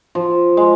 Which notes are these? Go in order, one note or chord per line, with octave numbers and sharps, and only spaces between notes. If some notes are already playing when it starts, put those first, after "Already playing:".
F3
G#3